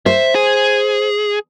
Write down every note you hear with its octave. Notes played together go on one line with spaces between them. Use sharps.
C5 E5
G#4